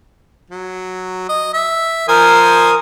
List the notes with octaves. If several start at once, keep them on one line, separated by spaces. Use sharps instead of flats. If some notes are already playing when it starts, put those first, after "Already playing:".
F#3
D#5
E5
F3 A#4 C5 G#5 D#6